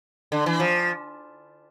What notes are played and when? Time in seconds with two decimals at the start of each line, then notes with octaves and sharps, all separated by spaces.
0.32 D3
0.46 E3
0.60 F3